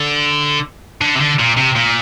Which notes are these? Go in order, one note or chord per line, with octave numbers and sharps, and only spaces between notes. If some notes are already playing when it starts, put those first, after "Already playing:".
Already playing: D3
D3
C3
D3
A#2
C3
A#2